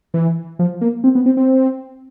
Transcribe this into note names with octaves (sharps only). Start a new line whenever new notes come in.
E3
F3
A#3
C4
B3
C4
C4